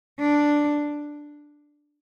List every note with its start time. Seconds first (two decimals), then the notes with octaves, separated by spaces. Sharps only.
0.20 D4